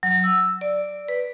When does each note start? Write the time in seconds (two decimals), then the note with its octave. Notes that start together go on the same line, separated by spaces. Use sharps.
0.03 F#3
0.24 E6
0.61 D5
1.08 B4